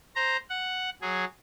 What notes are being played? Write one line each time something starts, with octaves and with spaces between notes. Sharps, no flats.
C5 A#5
F#5
F#3 G#4